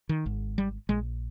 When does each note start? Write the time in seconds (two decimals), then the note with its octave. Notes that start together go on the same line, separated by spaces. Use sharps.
0.09 D#3
0.26 G#1 G#2
0.58 G3
0.89 A#1 A#2 G#3